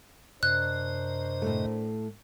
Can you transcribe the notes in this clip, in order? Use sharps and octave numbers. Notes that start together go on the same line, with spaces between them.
F#2 C3 D4 A#4 C5 D#5 F#6
A2 A3